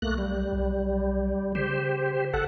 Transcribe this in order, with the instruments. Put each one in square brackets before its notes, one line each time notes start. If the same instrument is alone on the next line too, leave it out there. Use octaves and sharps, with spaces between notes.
[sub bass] B1 [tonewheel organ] A3 A#3 F#6
[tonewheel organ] G3
[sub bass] B1
[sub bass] C#3 [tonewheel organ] G4 C5
[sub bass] G1 [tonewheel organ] A4 F#5